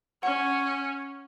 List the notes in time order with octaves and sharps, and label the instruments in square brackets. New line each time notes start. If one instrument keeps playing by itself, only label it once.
[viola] C#4 [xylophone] F#5